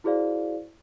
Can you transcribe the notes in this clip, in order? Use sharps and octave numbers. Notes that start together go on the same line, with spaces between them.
E4 F#4 G#4 C5 D5 F5